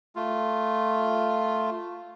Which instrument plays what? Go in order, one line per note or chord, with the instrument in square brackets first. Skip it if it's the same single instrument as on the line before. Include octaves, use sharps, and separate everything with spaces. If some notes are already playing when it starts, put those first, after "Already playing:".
[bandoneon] A3 F4